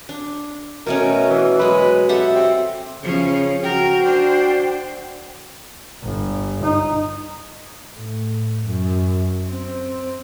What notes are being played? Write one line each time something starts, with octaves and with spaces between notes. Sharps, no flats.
D4
B2 A3 C#4 A#4
E3
F#3 G#3 B4
G4 A4 E5 F#5
C4
C#3 F3 C#4
F#4 A#4 G5
D4 C5
G1
D#4
A2
F#2
C4